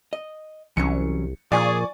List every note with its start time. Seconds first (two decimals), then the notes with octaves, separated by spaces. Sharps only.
0.13 D#5
0.77 C2 E3 F#3 C#4 C#7
1.52 A#2 F3 G#4 D5 G#5 C#6